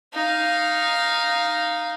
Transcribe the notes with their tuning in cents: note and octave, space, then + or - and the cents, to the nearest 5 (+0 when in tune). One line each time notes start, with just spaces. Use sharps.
D#4 +0 F5 +0